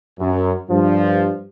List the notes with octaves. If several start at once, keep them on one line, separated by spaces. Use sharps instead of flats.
F#2
G2 F3